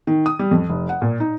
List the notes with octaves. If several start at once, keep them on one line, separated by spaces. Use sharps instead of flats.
D#3
D#6
G3
F2
F1
F#5
A#2
D#4